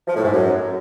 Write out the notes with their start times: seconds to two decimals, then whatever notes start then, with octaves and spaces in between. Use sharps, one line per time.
0.07 F3
0.16 A2
0.24 G#2
0.33 F#2